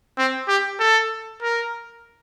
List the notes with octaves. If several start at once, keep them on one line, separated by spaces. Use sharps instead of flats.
C4
G4
A4
A#4